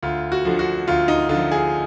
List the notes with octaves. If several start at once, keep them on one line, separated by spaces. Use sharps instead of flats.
D2 F4
F#4
D3 F3
F#4
D2 F4
D#4
D3 F4
F3
G#4